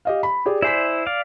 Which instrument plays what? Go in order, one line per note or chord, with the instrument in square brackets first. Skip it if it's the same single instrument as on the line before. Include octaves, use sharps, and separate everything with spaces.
[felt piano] G4 D#5 F5
B5
G4 G#4 D5
[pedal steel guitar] E4 C5 [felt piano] D5 G#5 B6
[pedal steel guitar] D5 F5